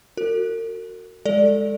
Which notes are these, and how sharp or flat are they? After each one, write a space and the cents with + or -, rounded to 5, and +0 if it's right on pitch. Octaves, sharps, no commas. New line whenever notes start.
F#4 +0 A#4 -40
G#3 +0 A4 +15 D5 +0